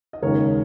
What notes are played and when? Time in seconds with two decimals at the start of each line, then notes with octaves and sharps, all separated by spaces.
0.13 D#5
0.22 D#2 C#3 G#3 A#4 C#5